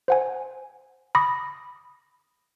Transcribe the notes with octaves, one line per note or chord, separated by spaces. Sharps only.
C5 F#5 G#5
B5 D6 D#6 A#6